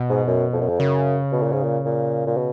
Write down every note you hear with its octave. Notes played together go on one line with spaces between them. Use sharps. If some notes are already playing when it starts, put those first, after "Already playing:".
Already playing: B2
G#2
F#2
F2
F#2
F2
F#2 C#3
B2
A#2
G#2
A#2
A#2
A#2
B2